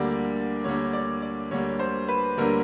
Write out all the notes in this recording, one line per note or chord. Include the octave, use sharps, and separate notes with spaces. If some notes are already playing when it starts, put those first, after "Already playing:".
Already playing: D2 D3 G3 A#3 D5
D2 D3 G3 A#3 C#5
D5
D5
D2 D3 G3 A#3 C#5
C5
B4
D2 D3 G3 A#3 A#4